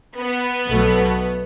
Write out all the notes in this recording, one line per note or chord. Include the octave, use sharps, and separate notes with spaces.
B3
B1 B2 F#3 A3